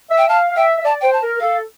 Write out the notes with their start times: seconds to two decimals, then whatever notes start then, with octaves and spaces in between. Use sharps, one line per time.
0.10 E5
0.18 G5
0.29 F5 A5
0.52 F5
0.56 E5 G5
0.79 E5
0.84 D5 A5
1.01 C5 G5
1.13 A5
1.23 A#4
1.40 A4 F5